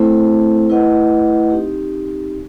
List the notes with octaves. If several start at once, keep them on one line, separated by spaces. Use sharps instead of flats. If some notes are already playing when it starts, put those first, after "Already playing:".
Already playing: A3 C4 E4 A4 C5
A3 E4 B4 D#5 F#5
C4 D#4 G4